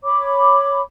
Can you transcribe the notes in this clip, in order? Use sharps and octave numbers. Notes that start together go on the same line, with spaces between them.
C#5 B5 D6